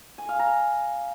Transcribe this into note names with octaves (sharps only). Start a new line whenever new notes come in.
G#5
F5
A#5